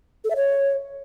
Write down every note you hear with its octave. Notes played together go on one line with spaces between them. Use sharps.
A4
E5
C#5